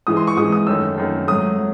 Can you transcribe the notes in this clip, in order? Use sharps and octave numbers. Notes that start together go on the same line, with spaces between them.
G#2 E3 G#3 D#6
C6
C#6
G#2 E3 G#3 D#6
D#6
F#2 D#3 A3 E6
F#2 D#3 A3
G#2 F#3 A3 D#6
F#3